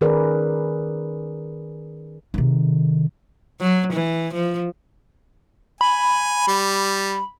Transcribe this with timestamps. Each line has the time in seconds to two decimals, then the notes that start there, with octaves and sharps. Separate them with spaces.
0.01 D#3 C#4 G#4 A#4 B4 D5
2.34 C3 D#3
3.61 F#3
3.93 E3
4.34 F3
5.81 G#5 B5
6.47 G3